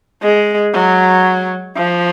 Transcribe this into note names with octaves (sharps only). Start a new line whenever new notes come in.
G#3
F#3
F3